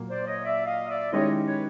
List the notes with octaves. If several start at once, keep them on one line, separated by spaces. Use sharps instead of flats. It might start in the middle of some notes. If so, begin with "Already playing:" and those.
Already playing: A#2 F#3 A#3
C5 D5
C#5 D#5
D5 E5
D#5 F5
D5 E5
D#3 G#3 C#4 E4 G4 C#5 D#5
B4 C#5